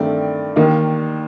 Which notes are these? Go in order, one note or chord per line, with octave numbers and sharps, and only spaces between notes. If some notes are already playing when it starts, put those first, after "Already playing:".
Already playing: G2 D#3 A3 C4 D5
D#2 D#3 A#3 D#4